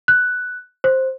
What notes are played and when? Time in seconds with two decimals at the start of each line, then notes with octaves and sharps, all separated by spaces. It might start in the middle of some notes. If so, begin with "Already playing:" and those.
0.08 F#6
0.84 C5